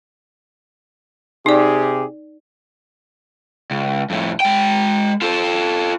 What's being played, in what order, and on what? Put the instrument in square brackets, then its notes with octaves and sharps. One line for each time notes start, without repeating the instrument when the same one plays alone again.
[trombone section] C3 G4 G#4 [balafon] D#4 D5
[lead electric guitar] C#2
F2 A2
G#3 G5
F4 A4